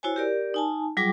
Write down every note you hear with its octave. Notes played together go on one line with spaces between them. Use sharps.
E4 F#4 C5 C#5 G#5
G4 A#4 D5
D#4 G#5 A5
F#3 G3 F4 G#4 G5 D6